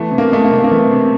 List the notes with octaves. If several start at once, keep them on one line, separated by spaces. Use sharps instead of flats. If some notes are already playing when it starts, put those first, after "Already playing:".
Already playing: E3 A3 B3
C3
A#3
G#3 A3
A#3
C3
A#3
E3 A3
C3